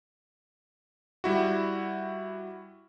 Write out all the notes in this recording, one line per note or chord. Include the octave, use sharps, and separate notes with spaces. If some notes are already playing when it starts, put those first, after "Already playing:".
G3 E4 F#4